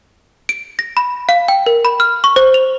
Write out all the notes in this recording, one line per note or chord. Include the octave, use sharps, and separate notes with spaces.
D7
A#6
B5
F5
G5
A#4
B5
F6
C#6
C5
F7